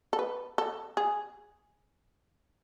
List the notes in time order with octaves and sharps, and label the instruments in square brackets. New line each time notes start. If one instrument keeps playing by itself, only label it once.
[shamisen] A4
B4
A4
G#4